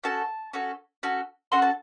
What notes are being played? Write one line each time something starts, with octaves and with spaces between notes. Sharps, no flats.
C#4 F#4 A4 A5
C#4 F#4 A4
C#4 F#4 A4
C#4 F#4 A4 C6
A5